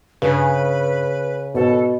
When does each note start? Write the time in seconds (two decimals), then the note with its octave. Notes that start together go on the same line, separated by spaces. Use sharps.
0.22 G2 C#3 B4
1.55 G#2 B2 A4